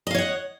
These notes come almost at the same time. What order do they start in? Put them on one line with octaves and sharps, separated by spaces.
D#5 F5 C#5 F#5